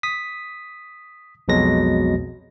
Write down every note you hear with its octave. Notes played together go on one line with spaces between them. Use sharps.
D#6 B6
B1 F2 B2 F#3 G#3 A#6